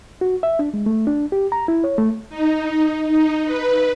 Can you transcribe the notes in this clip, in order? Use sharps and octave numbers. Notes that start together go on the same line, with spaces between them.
F#4
E5
D4
G#3
A3
D4
G4
A#5
E4
C#5
A3
D#4
D#4
B4